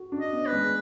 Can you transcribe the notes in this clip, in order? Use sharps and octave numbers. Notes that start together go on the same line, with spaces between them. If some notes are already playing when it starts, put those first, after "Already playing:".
Already playing: F#4
D4
D#5
B3
B4
G#3